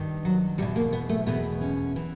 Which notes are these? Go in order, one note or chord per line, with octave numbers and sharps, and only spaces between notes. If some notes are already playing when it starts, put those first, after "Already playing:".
Already playing: G2 D#3
F#3
E2 B2 G3
A#3
B3
A3
E2 B2 B3
C#4
E3